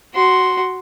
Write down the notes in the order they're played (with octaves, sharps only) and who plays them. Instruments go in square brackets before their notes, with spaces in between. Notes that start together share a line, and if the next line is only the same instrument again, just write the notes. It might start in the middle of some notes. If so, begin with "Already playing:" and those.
[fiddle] F#4 C6